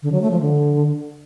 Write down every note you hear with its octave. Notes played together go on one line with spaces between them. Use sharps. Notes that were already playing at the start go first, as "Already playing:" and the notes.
D3
F#3
A3
F3
D3